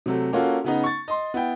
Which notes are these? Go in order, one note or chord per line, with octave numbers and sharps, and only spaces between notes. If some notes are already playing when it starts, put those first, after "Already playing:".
C3 F#3 A3
A#3 C#4 F4 F#4 A4
C#3 B3 D#4
C#6 A6
D#5 C6
B3 E4 G5